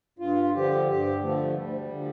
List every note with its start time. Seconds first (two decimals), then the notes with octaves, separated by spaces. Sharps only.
0.19 G2 F4
0.54 D3 F3 G4
0.87 G2 G4
1.21 D3 F3 A3
1.54 D2 G3
1.88 D3 F3